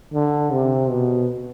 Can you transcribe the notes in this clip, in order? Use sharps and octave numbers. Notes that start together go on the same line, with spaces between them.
D3
C3
B2